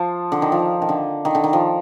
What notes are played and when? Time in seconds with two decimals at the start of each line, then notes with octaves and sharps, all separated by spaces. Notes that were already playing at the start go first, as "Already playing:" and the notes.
Already playing: F3
0.32 D3
0.42 D#3
0.52 F3
0.82 D#3
0.89 D3
1.25 D#3
1.35 D3
1.44 D#3
1.53 F3